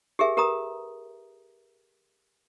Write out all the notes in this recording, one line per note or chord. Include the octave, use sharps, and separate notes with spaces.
G4 G#4 A#4 E5 G#5
G4 A#4 B4 A#5 D#6